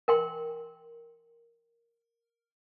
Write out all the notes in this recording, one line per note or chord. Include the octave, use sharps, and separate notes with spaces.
A#4 G5 C6